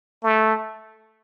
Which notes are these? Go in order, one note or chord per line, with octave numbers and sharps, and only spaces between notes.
A3